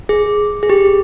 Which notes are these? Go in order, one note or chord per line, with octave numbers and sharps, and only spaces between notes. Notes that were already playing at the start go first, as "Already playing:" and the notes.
G#4
G#4
G4